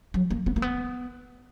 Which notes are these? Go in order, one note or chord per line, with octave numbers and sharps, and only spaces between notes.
F#3
A#3
B3
A#3
B3